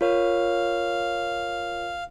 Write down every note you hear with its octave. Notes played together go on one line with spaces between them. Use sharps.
F4 A#4 C#5 F5